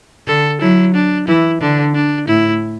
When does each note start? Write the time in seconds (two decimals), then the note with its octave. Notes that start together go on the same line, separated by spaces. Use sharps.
0.27 D3 A4
0.61 F#3 E4
0.94 D4
1.28 E3 E4
1.61 D3 D4
1.95 D4
2.28 A2 E4